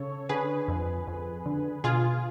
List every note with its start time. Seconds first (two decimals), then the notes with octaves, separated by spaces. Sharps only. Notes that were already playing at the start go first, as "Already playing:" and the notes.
Already playing: C#3 A4 C#5
0.29 D3 G#4 B4
0.68 F2
1.07 F2
1.46 D3
1.84 B2 F4 G#4